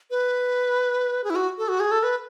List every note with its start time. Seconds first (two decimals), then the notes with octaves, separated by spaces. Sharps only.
0.10 B4
1.24 G#4
1.30 E4
1.35 F#4
1.58 A4
1.68 F#4
1.80 G#4
1.91 A4
2.03 B4